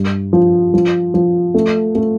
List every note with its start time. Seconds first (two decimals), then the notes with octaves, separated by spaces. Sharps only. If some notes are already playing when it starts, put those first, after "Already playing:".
Already playing: G2
0.33 F3
0.74 F3
1.14 F3
1.54 A3
1.95 A3